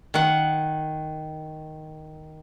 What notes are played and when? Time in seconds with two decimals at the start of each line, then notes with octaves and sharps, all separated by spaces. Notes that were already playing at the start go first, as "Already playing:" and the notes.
0.14 D#3 F#5